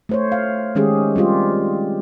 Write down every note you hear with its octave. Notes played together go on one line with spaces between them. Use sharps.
A3 C5 C#5
F5
D#3 G#3 C#4 G4 G#4
G3 C4 F4 G4